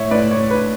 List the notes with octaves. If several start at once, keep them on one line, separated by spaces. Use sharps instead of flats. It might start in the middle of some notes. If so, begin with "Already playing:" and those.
Already playing: A2 C#5 E5
A2 B4 D5
A2 C#5
D4 B4